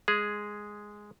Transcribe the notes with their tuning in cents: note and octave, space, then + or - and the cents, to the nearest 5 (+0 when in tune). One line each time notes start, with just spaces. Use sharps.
G#3 +0 G#4 +0